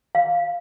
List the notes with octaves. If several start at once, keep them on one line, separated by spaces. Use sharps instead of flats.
F5